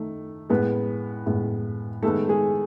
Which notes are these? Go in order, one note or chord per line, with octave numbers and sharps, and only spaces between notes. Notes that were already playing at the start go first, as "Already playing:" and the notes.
Already playing: D#3 A3
A2 G#3 B3 B4
A2 G#3 B3
D#3 G#3 A3 B3 A4
G#3 G#4